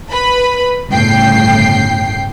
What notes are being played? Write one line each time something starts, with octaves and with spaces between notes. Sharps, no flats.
B4 B5
G1 A2 C#3 G5 C7